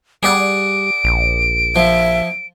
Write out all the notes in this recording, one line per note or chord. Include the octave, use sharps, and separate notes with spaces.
G3 G#4 D5 F#5 D7
A#1
F3 E5